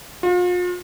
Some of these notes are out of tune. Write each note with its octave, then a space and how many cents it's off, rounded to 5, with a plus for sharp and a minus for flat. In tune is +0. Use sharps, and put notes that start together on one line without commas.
F4 +40